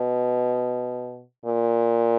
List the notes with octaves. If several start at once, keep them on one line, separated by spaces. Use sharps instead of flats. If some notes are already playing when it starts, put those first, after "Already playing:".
Already playing: B2
A#2